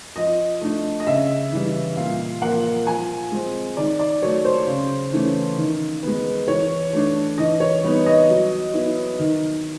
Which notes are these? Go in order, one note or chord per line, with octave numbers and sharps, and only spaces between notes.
F3 D#5
A3 D4
D#5
C#3 E5
E3 G3
A#2 F5
F3 A#3 F#5
F3 G#5
G#3 C4
D#3 D5
D5
F#3 A3 C#5
C5
C#3
E3 A3 C#4
D#3
G#3 B3
E3 C#5
A3 D4
E3 D#5
C#5
G3 B3 D#4
D#5
F#3
B3 E4
D#3